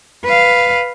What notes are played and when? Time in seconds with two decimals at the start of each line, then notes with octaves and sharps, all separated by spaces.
0.24 B4 F5